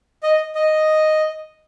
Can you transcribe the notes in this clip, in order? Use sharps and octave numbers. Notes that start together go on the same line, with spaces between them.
D#5
D#5